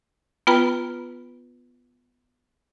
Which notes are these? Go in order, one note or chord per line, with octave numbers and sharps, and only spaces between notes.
B3 F4 B4 G5 A#5 B5